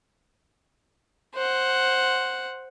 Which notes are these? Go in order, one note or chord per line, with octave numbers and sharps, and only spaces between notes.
C5 F#5